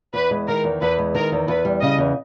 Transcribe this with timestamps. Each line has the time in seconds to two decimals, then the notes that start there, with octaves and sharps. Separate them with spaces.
0.14 E2 B4
0.31 G#3
0.47 D#3 A#4
0.64 E2
0.81 E2 B4
0.99 G#3
1.15 D#3 A#4
1.32 E2
1.48 E2 B4
1.65 G3
1.82 C#3 D#5
1.98 E2